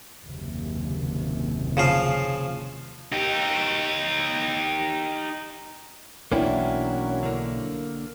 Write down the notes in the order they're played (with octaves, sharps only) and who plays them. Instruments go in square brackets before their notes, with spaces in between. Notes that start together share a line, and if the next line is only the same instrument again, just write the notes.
[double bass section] F#1 D#2 C3
[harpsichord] C#3 F3 F5
[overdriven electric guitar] D#4 G4
[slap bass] B1 [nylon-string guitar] E3 D4 G5 [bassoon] F#3 [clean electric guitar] A#3 C#4 E4
[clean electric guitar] D3 A#3